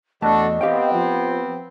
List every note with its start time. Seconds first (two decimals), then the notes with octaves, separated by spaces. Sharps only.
0.22 E2 A3 D4 F#4 A4 D#5 A5
0.61 B3 C4 G4 F5 G5
0.93 F3